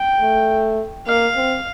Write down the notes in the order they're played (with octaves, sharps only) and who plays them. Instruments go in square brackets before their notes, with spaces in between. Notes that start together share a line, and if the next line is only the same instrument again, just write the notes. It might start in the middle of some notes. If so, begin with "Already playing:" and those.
Already playing: [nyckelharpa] G5
[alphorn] A3
[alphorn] A#3 [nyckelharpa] F5
[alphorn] C4